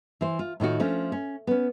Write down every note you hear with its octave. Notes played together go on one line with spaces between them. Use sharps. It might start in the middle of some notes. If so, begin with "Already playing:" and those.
E3 C5
F4
A2 D#3 F4 F#4
F3 A3 C#4 D4
C#4
B3 C#4